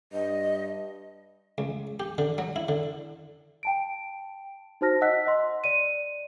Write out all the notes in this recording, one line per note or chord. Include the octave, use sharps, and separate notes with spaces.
G2 D#5
C#2
G4
D3
F#3
E4
D3
G5 A5 D7
D#4 F#4 C5 A5 F6 A#6
D#5 F#5 E6 F#6 B6
D#5 C6
D5 D#7